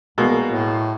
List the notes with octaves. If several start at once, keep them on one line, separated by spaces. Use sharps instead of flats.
C2 B2 G#3 A#3
A2